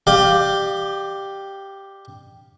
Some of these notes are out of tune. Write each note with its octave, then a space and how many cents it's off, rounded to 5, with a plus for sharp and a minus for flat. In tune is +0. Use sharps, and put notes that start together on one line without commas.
G4 +0 D5 +40 F5 +10